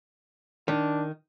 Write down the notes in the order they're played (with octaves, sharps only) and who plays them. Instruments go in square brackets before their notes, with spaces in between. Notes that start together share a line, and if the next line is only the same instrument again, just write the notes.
[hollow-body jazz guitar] D#3 [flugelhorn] D4